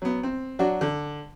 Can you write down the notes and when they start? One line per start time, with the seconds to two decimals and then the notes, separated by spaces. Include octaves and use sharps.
0.02 F#3 B3
0.23 C4
0.59 F#3 D4 F#4
0.81 D3